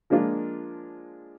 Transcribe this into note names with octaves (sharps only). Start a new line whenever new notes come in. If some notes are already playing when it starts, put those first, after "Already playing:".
F3 G#3 A#3 D4 F4